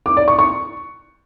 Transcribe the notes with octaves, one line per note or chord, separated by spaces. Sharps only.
D6
D5
C#6
C#6